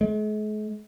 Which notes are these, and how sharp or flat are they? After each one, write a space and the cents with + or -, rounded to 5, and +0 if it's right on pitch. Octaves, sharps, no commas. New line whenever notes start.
G#3 +45